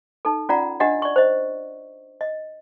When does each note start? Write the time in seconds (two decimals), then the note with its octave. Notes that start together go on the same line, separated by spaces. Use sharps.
0.25 D#4 A4
0.49 C#4 F4 D5 F#5 A#5
0.80 D4 G4 D#5 F#5
1.02 D5 C#6
1.16 C5 D#5
2.21 D#5